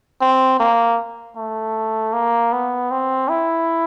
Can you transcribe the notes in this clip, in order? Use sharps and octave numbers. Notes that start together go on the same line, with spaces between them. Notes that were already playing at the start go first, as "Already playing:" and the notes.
C4
A#3
A3
A#3
B3
C4
E4